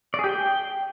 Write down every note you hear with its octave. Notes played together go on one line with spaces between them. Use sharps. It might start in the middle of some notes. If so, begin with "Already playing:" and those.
D5
G#4
G4
G5